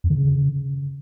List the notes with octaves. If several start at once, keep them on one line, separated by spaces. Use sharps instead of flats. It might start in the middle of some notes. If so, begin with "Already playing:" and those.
F2
D3
C#3